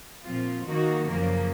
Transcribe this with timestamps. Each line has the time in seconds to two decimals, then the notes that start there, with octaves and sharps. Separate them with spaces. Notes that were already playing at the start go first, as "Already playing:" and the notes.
0.23 A#2 F3 C4 F4
0.64 D#3 A#3 D#4 F#4
1.06 F#2 C#3 F3 A#3